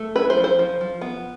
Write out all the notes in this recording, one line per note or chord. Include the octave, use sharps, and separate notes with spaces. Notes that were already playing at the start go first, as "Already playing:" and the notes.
Already playing: A3
E4 B4
C5
F3
C5
F3
F3
B3